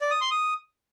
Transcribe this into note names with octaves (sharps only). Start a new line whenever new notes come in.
D5
D#6
C6
D#6